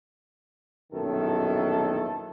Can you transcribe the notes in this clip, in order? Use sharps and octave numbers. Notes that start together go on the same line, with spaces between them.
A#1 F#2 B2 D#3 E4 A4